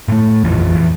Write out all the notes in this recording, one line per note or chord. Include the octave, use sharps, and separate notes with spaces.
A2 A3
A#1 F2 E3 F3
E2 E3